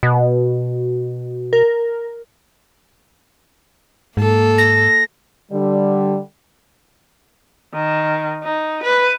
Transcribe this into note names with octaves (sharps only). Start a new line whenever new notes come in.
B2
A#4
G#2 A#3 A4
A#6
D3 G3
D#3
D#4
B4